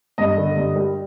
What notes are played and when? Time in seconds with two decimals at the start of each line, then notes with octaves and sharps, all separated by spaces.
0.18 G2 D#5
0.37 D3
0.57 G2
0.76 G3